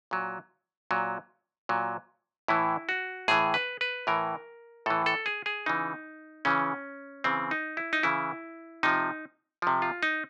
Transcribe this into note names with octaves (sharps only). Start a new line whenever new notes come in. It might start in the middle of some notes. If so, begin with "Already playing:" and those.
A#2 F#3
A#2 F#3
A#2 F#3
A2 E3 E4
F#4
A2 E3 G#4
B4
B4
A2 E3 A#4
A2 E3 A4
A4
G#4
G#4
C#3 E3 D#4
C#3 E3 C#4
C#3 E3 C4
D#4
E4
D#4
C#3 E3 E4
C3 F3 D#4
C3 F3
F4
D#4